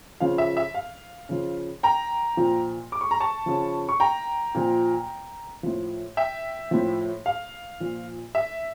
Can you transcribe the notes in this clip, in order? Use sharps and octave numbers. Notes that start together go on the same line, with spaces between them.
C#3 F3 F5
E5
E5
F5
C#3 F3
G5 A#5
A#2 F3
D6
C#6
A#5
A5 C#6
C#3 F3
C#6
G5 A#5
A#2 F3
A2 F3
E5 G5
A2 F3
F5
A#2 F3
E5